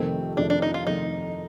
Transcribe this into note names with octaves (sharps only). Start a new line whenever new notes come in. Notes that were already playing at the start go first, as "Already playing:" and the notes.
Already playing: F2 C3 D#3 A3 C4
F2 C3 D#3 A3 D4
D4
D#4
F4
F2 C3 D#3 A3 D#4